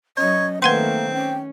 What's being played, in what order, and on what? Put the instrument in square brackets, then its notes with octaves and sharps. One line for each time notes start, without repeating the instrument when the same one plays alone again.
[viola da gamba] F#3 C#4 [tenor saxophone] C#5 [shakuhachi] D#5
[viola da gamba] D#3 A3 [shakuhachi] A#3 [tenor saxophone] C4 [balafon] B4 F#5 C6
[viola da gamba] C#4 [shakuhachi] G5